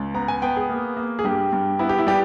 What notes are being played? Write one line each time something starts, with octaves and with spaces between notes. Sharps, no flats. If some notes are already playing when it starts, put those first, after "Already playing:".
Already playing: C#2
B3 A#5
G#5
B3 G5
G#4
A#3
A#3
G#4
G2 G4
G2
B3 E4
G4
E4
G3 G4